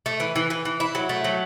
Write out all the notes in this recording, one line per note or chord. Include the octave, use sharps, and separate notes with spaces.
A3
E3
E3
E3
E3
E4
F#3
A3
F#3